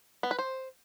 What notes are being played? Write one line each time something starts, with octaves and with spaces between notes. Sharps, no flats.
B3
B4
C5